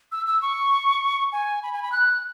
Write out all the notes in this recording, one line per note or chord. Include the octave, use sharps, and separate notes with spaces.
E6
E6
C#6
G#5
B5
G#5
B5
F#6